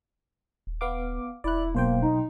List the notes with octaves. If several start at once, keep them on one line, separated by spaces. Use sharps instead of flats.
D#1
B3 F5 D6
E1 E4 D5 F#6
B1 A#3 C5 G5
D#4